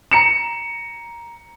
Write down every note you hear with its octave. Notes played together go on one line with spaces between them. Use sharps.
A#5 C#7 E7